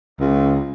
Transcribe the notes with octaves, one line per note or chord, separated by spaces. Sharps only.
C#2